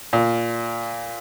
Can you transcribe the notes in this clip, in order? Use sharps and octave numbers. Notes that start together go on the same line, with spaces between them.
A#2